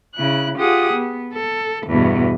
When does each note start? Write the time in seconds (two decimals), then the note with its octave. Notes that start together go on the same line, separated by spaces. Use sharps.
0.16 C#3 E4 F#6
0.57 F4 G4 G#4 F#5 D#6
0.93 B3
1.34 A4
1.87 E2 G2 B2